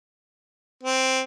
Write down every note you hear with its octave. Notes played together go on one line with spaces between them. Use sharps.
C4